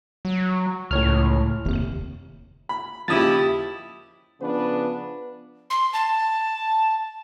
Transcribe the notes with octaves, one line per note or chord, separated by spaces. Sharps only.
F#3
C#2 A2 C#5 F6
F1 D#2 C3
B5
D#2 C#3 F3 E4 G4 D#6 A6
C#3 F3 B3 D4 B4
C6
A5